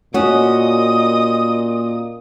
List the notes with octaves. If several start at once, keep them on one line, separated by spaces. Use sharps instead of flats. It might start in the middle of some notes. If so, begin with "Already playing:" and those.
A#2 C#4 F#4 D#5 D#6